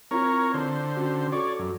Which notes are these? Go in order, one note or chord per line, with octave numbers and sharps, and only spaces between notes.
C4 E4 F4 A#4 C#5
D3 C5
C#4 F#4
F#4 A4 C#5 D5
F#2